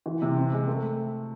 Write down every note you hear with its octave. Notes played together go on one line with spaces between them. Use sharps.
E3
C3
C4
G#3
A3